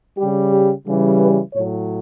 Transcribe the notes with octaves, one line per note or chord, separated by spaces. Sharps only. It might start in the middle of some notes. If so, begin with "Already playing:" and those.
C#3 G3 G4
G4
C#3 E3 G3
B4
A2 F#3 C#5